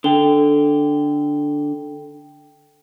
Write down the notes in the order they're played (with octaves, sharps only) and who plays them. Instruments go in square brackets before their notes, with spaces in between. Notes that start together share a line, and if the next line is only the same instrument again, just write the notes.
[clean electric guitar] D3 [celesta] A4 G5 G7